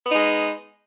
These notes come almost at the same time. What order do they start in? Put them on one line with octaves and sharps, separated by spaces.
B3 D#4 G#3